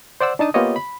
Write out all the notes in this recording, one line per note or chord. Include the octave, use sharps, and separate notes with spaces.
C5 D5 F#5 E6
D4 D#4 A5 D#6
A#3 B3 F4 G4 C#5 D#5
B5